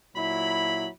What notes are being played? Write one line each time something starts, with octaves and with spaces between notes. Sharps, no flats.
A#2 F#3 E4 B5